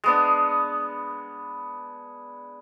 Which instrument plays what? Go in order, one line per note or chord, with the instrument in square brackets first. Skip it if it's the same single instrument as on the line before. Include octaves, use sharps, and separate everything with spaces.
[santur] G#3 B3 D4